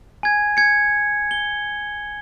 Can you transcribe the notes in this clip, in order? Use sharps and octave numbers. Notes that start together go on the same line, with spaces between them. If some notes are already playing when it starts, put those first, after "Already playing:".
G#5 G#6
G#6 C#7
G7